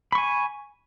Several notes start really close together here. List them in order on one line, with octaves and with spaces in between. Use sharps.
B5 C#6 G#5